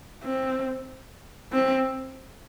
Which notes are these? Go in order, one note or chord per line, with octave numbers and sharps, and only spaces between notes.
C4
C4